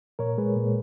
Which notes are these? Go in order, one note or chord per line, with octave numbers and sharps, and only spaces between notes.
A#2 A#4 C#5
G#3 G#4 B4
A#2